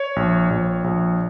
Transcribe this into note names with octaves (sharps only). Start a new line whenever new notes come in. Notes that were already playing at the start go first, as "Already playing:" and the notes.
Already playing: C#5
A#1
A#1
A#1